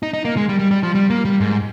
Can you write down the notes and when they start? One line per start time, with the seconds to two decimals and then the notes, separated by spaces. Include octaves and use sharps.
0.03 D#4
0.14 D#4
0.25 A#3
0.37 G#3
0.49 G3
0.59 G3
0.71 G3
0.83 F3
0.95 G3
1.10 A#3
1.25 G3
1.40 G#2